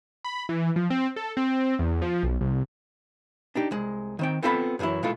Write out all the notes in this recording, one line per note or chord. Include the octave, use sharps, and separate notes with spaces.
B5
E3
F3
C4
A4
C4
E2
F3
B1
C2
D4 D#4 G4
C2 G#3
D#3 C4 G5
B3 C4 F4 A4 E5 B5
F#2 C3 E3 F#3 E4
B2 G#3 A3 E4 F4 A4